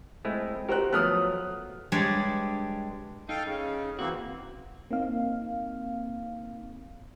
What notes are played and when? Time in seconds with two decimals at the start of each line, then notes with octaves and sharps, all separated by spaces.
0.25 G#3 A3 C4 E4
0.69 F#4 G4 A#4 C5 F#6
0.93 F3 F#3 A3 B3 D#6 F6 F#6
1.92 G2 G3 G#3 D4 C#5 D5
3.29 D#4 A4 F5 G5
3.45 C#3
3.99 E3 A#3 C4 F#4
4.91 A#3 C4 D#4 F5